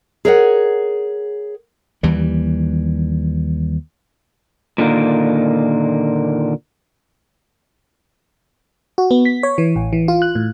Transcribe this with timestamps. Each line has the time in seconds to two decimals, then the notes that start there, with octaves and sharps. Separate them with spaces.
0.25 G#4 A#4 C#5 E5 F#5
2.03 D#2 E3 G3
4.78 A#2 D3 D#3 A#3
8.98 F#4
9.11 B3
9.25 B6
9.43 C#5
9.58 E3
9.76 A1
9.93 E3
10.08 F4
10.22 F#6
10.35 A2